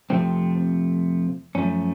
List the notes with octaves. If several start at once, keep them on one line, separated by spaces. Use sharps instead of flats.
F2 C3 F3 A3 C4
F#2 F3 A3 C#4